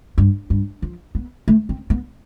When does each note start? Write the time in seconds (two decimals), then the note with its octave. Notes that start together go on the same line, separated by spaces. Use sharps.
0.18 G2
0.50 G2
0.82 F3
1.15 B3
1.48 A3
1.69 C4
1.90 B3